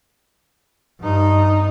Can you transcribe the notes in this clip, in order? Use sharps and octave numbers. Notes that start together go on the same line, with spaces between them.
G2 D#4